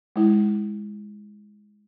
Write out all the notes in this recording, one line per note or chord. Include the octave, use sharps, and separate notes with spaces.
G#3 E4